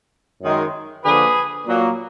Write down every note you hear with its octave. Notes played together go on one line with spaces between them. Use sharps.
F#2 D#3 G#3
D3 F3 A#3 G#4 B4
A#2 F#3 A#3